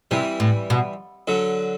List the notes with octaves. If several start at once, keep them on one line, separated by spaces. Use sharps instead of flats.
C3 E3 G3
A2
B2
D3 F#3